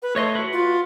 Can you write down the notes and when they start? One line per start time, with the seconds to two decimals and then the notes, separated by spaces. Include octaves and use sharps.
0.03 B4
0.16 A3 C#5 D#5 C6
0.35 F#4 B4
0.53 F4